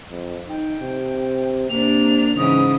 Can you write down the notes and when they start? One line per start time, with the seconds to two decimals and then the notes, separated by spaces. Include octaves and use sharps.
0.11 F2
0.49 D#4 G5
0.81 C3
1.70 C3 A#3 D4 F7
2.37 G#2 C#3 E3 D#6